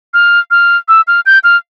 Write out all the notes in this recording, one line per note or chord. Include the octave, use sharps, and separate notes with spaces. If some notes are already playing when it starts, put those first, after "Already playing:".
F6
F6
E6
F6
G6
F6